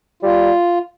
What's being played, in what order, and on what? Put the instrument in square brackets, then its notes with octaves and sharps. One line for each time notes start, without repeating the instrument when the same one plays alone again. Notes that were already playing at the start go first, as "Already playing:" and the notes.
[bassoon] G3 [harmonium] F4